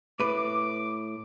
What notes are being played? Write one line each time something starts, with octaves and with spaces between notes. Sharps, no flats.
A2 B4 D6